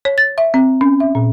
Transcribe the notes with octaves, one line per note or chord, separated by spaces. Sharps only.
C#5
A6
E5
C4
C#4
E5
A#2